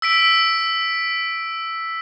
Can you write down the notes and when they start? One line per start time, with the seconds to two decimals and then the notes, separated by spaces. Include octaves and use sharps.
0.02 E6 B6 D7